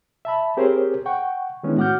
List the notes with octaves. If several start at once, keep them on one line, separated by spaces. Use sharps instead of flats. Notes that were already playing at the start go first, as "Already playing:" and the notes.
E5 A5 B5
C4 G4 G#4 A#4 C5 C#5
F#5 G5 C#6
D#3 G#3 B3 C#4 D4 E4
A2 F#4 F#5 D6 F6 G6